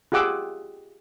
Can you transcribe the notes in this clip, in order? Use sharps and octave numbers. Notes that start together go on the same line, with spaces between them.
F4 G4 G#4 F#5 D6 E6